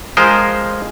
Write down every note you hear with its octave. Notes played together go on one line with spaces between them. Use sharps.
F3 G#3 A#4 C5 D#5